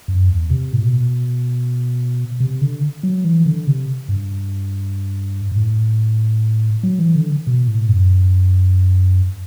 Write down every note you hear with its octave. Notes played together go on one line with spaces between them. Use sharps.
F#2
E2
C3
A2
B2
C3
D3
F#3
E3
D3
C3
G2
G2
A2
F#3
E3
D3
B2
A2
F#2